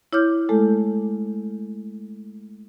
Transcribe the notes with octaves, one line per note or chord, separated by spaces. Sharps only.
E4 C#5 D6 F6 G6
G#3 A3 A4